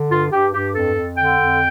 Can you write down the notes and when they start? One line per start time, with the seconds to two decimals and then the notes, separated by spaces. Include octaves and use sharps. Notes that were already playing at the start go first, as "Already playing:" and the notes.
Already playing: D3
0.09 G2 F4
0.31 G2 G4
0.53 G2 G4
0.74 F2 A4
0.95 F2
1.17 D3 G5
1.39 F2